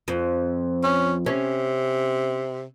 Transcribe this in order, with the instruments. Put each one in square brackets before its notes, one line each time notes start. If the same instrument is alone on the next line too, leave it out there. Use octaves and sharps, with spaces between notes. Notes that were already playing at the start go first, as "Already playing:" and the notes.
[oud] F2
[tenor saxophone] C#4
[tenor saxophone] C3 [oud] C#4